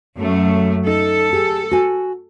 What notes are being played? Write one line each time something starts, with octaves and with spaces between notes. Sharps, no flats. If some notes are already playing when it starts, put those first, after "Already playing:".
F#2 A3
D#4 A4
G4 G#4
F#4 G#5